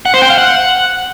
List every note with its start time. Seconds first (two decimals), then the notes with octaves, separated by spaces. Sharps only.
0.06 F#5
0.14 C5
0.22 G5
0.30 F5
0.38 F#5